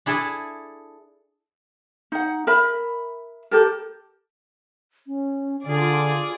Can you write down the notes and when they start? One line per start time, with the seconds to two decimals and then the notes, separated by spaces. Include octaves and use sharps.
0.06 D4 E4 G#4 A4
2.12 D#4 F#5
2.47 A#4 E5 B5
3.51 G4 A4 A#4
5.07 C#4
5.65 D3 F4 G#4 D5